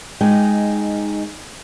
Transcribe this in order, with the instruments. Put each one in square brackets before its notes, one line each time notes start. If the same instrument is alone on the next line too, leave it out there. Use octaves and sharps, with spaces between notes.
[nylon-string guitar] G#3 D#4 G5